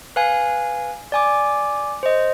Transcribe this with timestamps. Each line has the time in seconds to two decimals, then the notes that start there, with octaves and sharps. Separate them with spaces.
0.16 B4 F5 G#5
1.12 D5 G#5 D6
2.03 C5 D#5